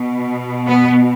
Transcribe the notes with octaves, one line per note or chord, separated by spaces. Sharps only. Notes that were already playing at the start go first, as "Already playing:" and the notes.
Already playing: B2
B3